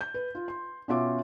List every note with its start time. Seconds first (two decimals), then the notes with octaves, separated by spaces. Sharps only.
0.01 G6
0.14 B4
0.35 F4
0.48 C6
0.88 B2 C#4 F4 F#4 E5 D6